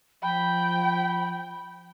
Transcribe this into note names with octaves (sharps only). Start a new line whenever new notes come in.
F3 G5 B5